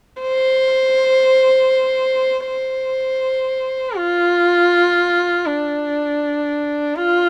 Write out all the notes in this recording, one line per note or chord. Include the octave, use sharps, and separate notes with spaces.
C5
C5
F4
D4
F4